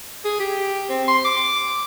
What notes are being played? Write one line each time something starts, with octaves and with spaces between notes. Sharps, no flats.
G#4
G4
C4
C6
D6